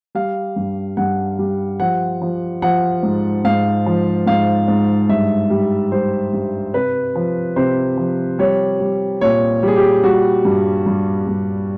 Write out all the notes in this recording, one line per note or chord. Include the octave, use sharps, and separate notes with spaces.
G3 F5
G2
G2 F#5
G3
F3 F#5
F3
F3 F#5
G#2
G#2 F5
F3
G#2 F5
G#2
G2 E5
G3
G3 C5
G2
C3 B4
F3
C3 C5
F3
G3 C#5
G3
A#2 C#5
G3 G#4
G4
G3 F#4
G2
G2
G2